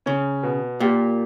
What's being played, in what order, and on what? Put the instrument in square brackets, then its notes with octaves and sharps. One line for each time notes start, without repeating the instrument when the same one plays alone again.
[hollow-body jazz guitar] C#3 [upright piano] C#4
[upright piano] B2
[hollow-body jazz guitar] A#2 [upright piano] G4